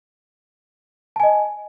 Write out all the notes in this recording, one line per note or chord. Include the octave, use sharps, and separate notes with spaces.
D#5 G#5 A5